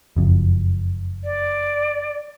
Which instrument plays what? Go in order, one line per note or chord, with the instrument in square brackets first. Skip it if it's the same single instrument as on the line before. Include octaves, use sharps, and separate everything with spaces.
[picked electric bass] F#1 F2
[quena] D5